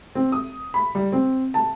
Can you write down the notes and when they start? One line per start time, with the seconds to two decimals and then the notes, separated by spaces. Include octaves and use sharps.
0.15 C4
0.32 D#6
0.74 B5
0.95 G3
1.12 C4
1.54 A5